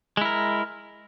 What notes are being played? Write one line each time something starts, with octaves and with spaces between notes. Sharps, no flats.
G#3 E4 A#4